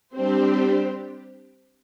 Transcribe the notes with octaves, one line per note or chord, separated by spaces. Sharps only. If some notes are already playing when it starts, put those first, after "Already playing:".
G3 C4 D4 G4 C5